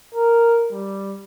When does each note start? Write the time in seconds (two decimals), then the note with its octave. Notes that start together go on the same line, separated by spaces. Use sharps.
0.15 A#4
0.72 G3